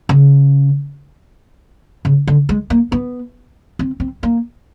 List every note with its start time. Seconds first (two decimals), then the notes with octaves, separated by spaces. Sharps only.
0.09 C#3
2.05 C#3
2.27 D3
2.49 G#3
2.70 A#3
2.92 B3
3.79 C4
4.00 C4
4.23 A#3